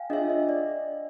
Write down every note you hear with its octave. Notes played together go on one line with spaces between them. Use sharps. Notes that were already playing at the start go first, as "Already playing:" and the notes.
Already playing: F5 G5 G#5
D4 F4 G#4 C#5 D#5 E5
D#5
D5